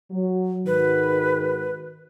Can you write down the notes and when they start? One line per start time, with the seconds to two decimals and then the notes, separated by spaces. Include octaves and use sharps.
0.11 F#3
0.67 G#2 D#3 F#4 B4